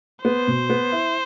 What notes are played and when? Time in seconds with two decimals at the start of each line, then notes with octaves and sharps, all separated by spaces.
0.24 B3 C5
0.48 B2
0.70 B3
0.92 E4